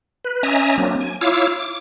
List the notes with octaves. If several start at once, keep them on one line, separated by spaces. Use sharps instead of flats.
B4
C#4 D#5 E5 G#5 A#5
F#3 A#3 C4 D4
G#5
E4 F4 C#5 F5 D6 E6
D6